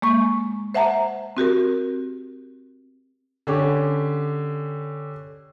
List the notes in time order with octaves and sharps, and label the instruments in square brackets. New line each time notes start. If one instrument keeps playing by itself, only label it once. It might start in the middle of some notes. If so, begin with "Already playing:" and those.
[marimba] G#3 A#3 C#6
C5 E5 F#5 A5 A#5
C4 F#4 G4 A#4
[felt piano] D3 C#4 G4